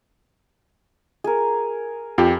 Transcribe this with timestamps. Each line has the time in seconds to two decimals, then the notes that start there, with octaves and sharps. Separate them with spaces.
1.24 G#4 A#4
2.18 F2 F4 G4